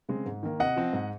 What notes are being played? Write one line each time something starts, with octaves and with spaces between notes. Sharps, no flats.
C#3 G#3 C4
G#2
D#3 A#3
C3 D#5 F#5
F3 C4
G#2